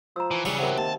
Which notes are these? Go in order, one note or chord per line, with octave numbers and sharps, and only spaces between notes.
F3 A#5 E6
E3 A5
C#3 E3 F#3 G3 G5 C#6
C3 A#4 F#5
D#2 A5